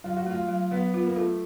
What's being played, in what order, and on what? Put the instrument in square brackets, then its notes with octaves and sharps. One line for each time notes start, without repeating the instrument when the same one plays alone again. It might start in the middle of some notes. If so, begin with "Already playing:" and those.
[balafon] F#3 [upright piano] F4
[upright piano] F#4
[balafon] A3 [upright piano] F4
[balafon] F#3
[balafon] F#3 [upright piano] B3
[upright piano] B3 [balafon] F4
[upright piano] A#3
[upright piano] A3 [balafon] F4